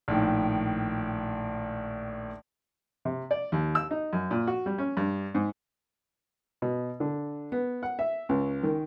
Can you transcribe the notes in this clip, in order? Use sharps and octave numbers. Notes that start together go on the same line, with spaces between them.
A#1 A2 D#3
C3
D5
D#2
E6
D#4
F#2
A#2
F#4
G3
C#4
G2
G#2
B2
D3
B3
F#5
E5
C#2
D#3